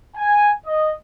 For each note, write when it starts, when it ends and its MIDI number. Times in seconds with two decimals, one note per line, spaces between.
0.16 0.51 80
0.66 0.91 75